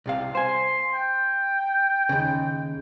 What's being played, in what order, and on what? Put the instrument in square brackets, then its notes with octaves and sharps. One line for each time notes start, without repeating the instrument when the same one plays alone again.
[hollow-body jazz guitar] C2 C3 F5
[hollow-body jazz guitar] C5 G#5 [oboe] C6
[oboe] G5
[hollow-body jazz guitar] D#2 C#3